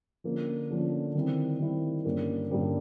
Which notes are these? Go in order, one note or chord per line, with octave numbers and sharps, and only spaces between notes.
D3 F3 A#3 C#4
D3 F3 A#3 C#4
D#3 G3 C4 E4
D#3 G3 C4 E4
G2 D3 G3 A#3 C#4
G2 D3 G3 A#3 C#4